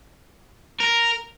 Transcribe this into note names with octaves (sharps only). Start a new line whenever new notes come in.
A#4